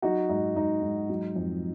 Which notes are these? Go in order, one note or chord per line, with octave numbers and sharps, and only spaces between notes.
F#3 D#4 F#4
G#2 D#4
G#2 D#4
G#2
F#3
F2